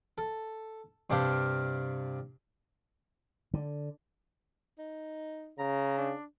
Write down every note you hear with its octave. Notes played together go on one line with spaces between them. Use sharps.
A4
G2 C3 D4 G4 F5
D3
D#4
C#3 A#5
D4